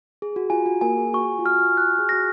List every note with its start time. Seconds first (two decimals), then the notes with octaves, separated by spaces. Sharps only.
0.22 G#4
0.36 F#4
0.50 F4 G#5
0.66 F#4
0.81 A#3 A#4 G#5
0.97 G#4
1.14 F#4 C#6
1.39 F4
1.45 F#4 F6
1.62 F4
1.77 F#4 F#6
1.99 G#4
2.09 F#4 A#6